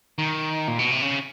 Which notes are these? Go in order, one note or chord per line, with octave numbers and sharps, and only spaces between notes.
D#3
A#2
B2
C3
C#3